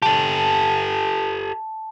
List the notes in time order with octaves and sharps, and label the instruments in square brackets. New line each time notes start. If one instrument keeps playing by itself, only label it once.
[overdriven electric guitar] G4 A4 [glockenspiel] A5